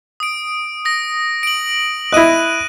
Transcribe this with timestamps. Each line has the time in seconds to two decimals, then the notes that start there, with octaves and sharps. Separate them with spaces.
0.20 D#6 D7
0.85 D#6 A#6
1.43 D7 F#7
2.12 E4 D#5 F#6 D#7